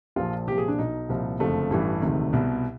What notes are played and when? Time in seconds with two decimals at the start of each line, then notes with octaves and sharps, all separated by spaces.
0.16 A#1 A#2 F3 F4
0.47 C2 A#2 F3 G4
0.58 G#4
0.68 D4
0.78 B1 B2 D#4
1.09 C2 A#2 F3
1.40 F#1 F2 D3 F3 A3
1.70 A1 G2 E3
2.02 E1 D2 C3 D#3
2.33 C2 B2